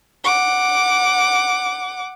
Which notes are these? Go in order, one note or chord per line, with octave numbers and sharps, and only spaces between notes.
F#5 D6